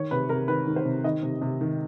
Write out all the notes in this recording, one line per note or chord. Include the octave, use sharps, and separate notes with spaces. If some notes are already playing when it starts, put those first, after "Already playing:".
Already playing: D#3 C#5
C3 B4
C3 A#4
D#3 B4
D#3
C5
C3
D#3 D#5
C3
C3
D#3